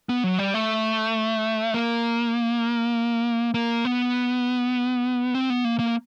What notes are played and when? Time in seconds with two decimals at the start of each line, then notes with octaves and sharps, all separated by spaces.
0.09 B3
0.24 F#3
0.39 G3
0.54 A3
1.74 A#3
3.54 A#3
3.85 B3
5.35 C4
5.50 B3
5.65 A#3
5.79 A#3